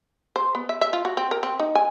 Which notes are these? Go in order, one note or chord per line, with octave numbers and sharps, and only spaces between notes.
C5
B3
E5
E5
F4
F#4
C4
A#4
C4
D#4
G#5